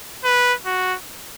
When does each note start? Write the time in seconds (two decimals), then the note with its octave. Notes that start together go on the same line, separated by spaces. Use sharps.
0.24 B4
0.66 F#4